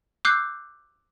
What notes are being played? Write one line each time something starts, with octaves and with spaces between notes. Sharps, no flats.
D6 E6 F#6 G6 C7